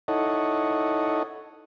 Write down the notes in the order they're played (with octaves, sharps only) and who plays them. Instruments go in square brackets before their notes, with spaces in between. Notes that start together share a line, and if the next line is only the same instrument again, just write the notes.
[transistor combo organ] D#4 E4 A4 C#5 D#5 F#5